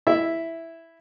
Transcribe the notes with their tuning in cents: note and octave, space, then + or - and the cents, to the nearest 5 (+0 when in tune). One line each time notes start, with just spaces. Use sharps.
E4 +0 E5 +0